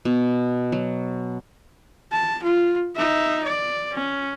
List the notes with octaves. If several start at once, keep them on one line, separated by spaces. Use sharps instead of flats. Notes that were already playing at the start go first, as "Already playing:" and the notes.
B2
F#3
A5
F4
D#4 E5
D5
C#4